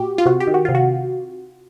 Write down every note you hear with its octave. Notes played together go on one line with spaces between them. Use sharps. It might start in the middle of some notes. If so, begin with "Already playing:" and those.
Already playing: A#2 F#4 G4
F4
C3 F#4
G4
D#3
F#4
C3 F4
F#4